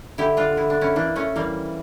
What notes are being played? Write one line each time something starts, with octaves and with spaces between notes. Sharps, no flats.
D3 E4 G4
D4 F4
E4
D4
C#4 E4
E3 A#3 D4
A3 C#4
E3 G3 A#3